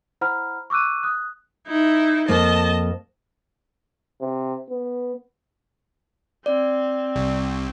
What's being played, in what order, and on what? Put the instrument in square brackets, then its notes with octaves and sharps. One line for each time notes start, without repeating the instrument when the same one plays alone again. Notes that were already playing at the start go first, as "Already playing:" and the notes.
[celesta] E4 C5 F#5 A#5 B5 F6
C#6 D6 E6 F#6 D#7
D#6 F#6
[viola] D#4 E4
[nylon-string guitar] F2 A#3 [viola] D#5 A5
[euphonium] C3
B3
[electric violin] C4 [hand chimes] D5
[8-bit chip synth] C2